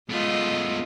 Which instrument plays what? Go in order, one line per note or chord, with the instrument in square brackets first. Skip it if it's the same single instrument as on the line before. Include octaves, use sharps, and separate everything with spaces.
[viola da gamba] G#3 F4 D#5 [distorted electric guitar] A3 B3